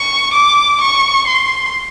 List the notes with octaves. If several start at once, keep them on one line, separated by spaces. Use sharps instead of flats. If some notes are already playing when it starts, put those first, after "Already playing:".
Already playing: C#6
D6
C#6
C6